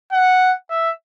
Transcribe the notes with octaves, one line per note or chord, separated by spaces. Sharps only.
F#5
E5